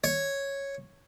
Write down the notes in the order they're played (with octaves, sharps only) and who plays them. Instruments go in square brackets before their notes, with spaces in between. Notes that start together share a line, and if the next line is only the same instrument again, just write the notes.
[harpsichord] C#5